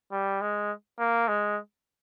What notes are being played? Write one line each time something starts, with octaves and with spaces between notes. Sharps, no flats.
G3
G#3
A#3
G#3